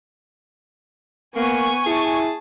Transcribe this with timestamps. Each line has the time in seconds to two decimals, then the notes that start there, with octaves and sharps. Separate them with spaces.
1.36 A#3 B3 G#5 C#6
1.86 E4 G#4 A5